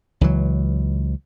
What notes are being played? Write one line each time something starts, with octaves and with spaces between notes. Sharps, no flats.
C#2 E3 F#3